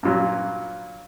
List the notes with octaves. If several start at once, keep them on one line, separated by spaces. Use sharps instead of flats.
G2 A#2 F#3